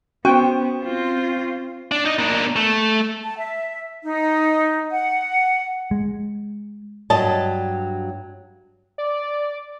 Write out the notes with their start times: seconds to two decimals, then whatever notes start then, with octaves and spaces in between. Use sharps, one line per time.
0.25 B3 C#4 F#4 C5 G5 C#6
0.82 C4 F4
1.92 D4
2.06 D#4 D#5
2.19 A#3 D4
2.56 A3
3.23 A5
3.38 E5
4.04 D#4
4.91 F#5
5.91 G#3
7.10 G2 F#3 D#5 A5
8.98 D5